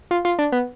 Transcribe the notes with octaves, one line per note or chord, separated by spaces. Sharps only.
F4
F4
D4
B3